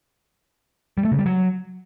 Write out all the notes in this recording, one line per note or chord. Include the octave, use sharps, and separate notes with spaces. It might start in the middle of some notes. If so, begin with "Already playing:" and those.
G3
A3
C#3
G3
F#3